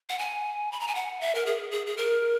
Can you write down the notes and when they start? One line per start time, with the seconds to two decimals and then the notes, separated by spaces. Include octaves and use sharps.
0.10 F#5
0.19 G#5
0.72 B5
0.80 A#5
0.88 G#5
0.95 F#5
1.21 E5
1.35 A#4
1.46 G#4
1.71 G#4
1.87 G#4
1.97 A#4